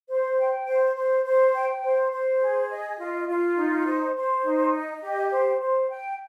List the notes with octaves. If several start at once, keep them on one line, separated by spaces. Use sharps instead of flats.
C5
G5
C5
C5
C5
G5
C5
C5
G#4
D#5
F4
F4
D#4
C5
C5
D#4
D#5
G4
C5
C5
G5